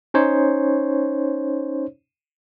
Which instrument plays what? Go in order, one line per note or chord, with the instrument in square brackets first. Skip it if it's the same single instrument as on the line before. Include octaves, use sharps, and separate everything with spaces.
[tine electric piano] C#4 D#4 C5 C#5